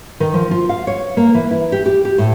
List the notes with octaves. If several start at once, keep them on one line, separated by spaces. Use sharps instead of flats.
D#3
F3
F4
F5
C#5
A#3
E3
E4
G4
G4
G4
A2